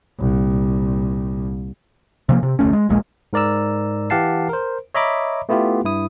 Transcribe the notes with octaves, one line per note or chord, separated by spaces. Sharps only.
C2 A#2
C3 F3 A#3
C3
F1 D2 A3 C#4
G#3
D#1 A#1 A#2 G#3
G#2 A#4 D5 A#5 E6
E3 G4 F5 F#5 A5 C7
A#4 C5
C#5 D#5 E5 A#5 B5 D6
A3 B3 E4 F4 G4
G2 E4 D#6